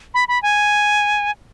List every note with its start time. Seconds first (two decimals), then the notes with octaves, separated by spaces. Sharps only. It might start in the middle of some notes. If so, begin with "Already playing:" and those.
0.14 B5
0.28 B5
0.43 G#5